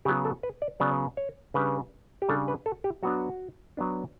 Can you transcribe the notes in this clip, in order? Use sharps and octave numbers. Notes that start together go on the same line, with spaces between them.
C#3 F#3 B3 G4
A4
B4
D5
C#3 F#3 B3 D5
C#5
C#3 G3 D4 B4
G4
C#3 G3 D4 A4
B4
A4
G4
F#3 B3 D4 F#4
F#3 B3 D4